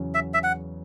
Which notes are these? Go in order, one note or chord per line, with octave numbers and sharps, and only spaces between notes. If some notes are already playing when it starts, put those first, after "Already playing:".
Already playing: E2 C#3 F#3 C#4
E5
E5
F#5